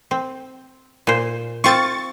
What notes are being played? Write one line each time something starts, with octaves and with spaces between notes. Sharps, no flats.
C4
A#2 C5
C4 F4 C#6 A6